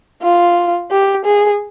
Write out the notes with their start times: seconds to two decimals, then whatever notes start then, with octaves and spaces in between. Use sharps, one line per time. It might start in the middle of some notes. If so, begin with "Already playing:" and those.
0.22 F4
0.91 G4
1.25 G#4